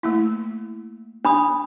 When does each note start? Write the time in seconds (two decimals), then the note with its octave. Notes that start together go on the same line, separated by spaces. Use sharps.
0.03 A3 A#3 E4
1.25 D4 G#5 B5 D#6